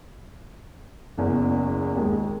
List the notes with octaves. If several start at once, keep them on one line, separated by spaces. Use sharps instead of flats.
F#1 E2
D#2 G#3